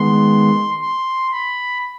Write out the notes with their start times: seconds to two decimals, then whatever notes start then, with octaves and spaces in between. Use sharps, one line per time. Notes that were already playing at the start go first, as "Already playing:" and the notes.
Already playing: D#3 G#3 B3 C6
0.81 C6
1.32 B5